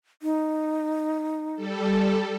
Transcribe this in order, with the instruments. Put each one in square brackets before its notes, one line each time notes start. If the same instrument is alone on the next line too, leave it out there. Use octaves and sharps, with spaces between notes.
[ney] D#4
[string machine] G3 A4